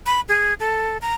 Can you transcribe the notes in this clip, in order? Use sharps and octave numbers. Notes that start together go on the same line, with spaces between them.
B5
G#4
A4
A#5